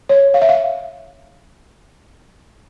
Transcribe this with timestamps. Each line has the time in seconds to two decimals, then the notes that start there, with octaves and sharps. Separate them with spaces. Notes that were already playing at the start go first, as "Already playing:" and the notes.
0.09 C#5
0.34 F5
0.42 E5
0.49 F5